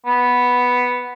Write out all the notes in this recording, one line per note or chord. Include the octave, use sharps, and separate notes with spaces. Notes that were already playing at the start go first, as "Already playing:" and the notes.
B3